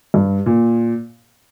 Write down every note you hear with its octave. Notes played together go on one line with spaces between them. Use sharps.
G2
A#2